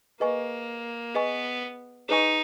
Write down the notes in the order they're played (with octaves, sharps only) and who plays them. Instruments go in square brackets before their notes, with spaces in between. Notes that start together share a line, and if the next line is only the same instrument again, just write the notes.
[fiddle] A#3 [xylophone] G#4 B4 D#5 G#5 C#6
[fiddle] B3 [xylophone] G#4 B4 D#5 G#5 C#6
[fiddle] D#4 [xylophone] G#4 B4 D#5 G#5 C#6